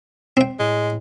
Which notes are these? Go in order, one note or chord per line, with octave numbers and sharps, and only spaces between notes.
C4 G5
A2 G#3